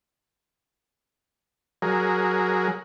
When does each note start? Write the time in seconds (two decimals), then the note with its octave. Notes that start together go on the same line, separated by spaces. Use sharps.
1.82 F#3 G#4 A#4